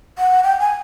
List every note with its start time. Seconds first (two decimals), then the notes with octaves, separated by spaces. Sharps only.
0.18 F#5
0.43 G5
0.60 G#5